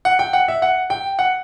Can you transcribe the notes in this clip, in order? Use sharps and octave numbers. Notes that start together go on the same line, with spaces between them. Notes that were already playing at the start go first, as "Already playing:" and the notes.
F#5
G5
F#5
E5
F#5
G5
F#5